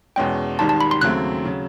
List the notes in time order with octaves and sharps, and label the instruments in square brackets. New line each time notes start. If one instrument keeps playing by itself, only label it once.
[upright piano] E2 B2 G#3 C#4 [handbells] G5
[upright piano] G#1 G#2 D#3 G3 [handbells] A5
[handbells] A5
B5
C6
[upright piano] D#2 C#3 F#3 A3 C4 [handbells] F#6
[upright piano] C#3 F#3